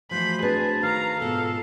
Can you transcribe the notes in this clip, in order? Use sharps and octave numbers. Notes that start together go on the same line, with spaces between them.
E3 F3 A3 F#4 C5 B5
C4 D4 G#4 B4 A5
D#3 F5 A#5
G#2 B2 F4 A4